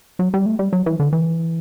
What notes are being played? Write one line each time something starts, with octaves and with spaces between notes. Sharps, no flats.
F#3
G3
A3
G3
F#3
E3
D3
E3